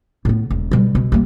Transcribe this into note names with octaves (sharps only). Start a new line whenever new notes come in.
A2 B3
E1
B2 G3
B2
G3 A#3